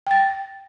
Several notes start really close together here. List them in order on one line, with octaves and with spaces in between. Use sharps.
G5 A6 A#6